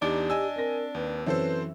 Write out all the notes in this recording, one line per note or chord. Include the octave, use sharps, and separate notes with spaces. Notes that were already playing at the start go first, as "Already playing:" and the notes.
E2 D4 D#4 G4 D6
D#5 G#5 E6
C4 A#4 A#6
D#2 B4
F#2 E3 C4 C#4 A4 B4 C5